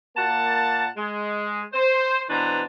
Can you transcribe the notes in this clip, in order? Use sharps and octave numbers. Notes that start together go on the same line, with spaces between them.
A#2 A#3 F#5 A5
G#3
C5
B2 E3 D4 B4 C5 A#5